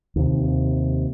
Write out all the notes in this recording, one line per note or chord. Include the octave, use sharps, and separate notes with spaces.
D#2 C3